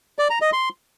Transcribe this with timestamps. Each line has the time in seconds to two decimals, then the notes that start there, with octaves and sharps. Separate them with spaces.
0.19 D5
0.30 A#5
0.41 D#5
0.53 C6